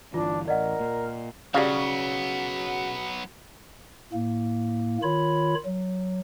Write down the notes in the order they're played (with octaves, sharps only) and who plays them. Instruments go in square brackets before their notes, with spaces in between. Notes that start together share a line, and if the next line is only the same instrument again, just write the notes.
[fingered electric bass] G1 E3 [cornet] D4 [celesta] F4
[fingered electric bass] A1 [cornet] A#4 [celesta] D5 D#5 F#5
[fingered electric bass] A#2
[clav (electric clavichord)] C#3 [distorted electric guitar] F#3 B3 [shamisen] G3 F5 [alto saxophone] F#4
[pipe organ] A2 A#3
D#3 F4 C#5 B5
F#3